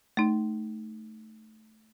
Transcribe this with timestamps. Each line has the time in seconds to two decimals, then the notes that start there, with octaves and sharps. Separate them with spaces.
0.17 A3 D#4